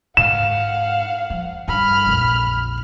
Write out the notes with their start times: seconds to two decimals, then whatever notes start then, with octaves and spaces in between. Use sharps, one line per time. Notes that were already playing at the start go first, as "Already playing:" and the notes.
0.17 G#2 F5 F#5 E7
1.30 F3
1.68 G2 B5 F6
2.06 A#1 F2